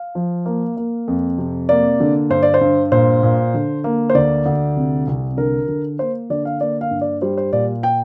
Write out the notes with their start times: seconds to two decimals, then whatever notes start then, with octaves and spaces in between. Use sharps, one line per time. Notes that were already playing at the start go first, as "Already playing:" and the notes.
Already playing: F5
0.15 F3
0.46 A#3
0.77 A#3
1.08 F2
1.38 C3
1.69 A#3 D5
2.00 D3
2.30 G2 C5
2.43 D5
2.54 C5
2.61 G2
2.92 A#2 C5
3.23 A#2
3.54 D3
3.84 A#3
4.10 C5
4.15 D2 D5
4.46 D2
4.76 C3
5.07 C2
5.37 D3 A#4
5.68 D3
5.99 A#3 C5
6.30 D3 D5
6.45 F5
6.60 A#3 D5
6.81 F5
6.91 G2
7.01 D5
7.22 G3 C5
7.38 C5
7.52 A#2 D5
7.83 G5